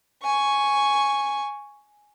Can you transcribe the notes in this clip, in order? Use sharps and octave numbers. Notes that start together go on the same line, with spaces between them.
G#5 C#6